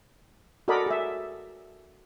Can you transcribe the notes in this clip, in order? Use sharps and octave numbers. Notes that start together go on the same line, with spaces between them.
F#4 A4 A#4 D5 D#5 B5
G#4 E5